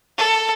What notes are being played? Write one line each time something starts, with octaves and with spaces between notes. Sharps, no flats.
A4